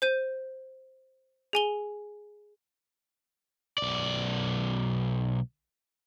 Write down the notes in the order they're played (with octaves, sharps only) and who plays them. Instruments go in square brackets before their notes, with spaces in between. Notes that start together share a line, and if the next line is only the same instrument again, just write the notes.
[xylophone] C5 G6 D#7
G#4 G#5 G7
[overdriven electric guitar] B1 D5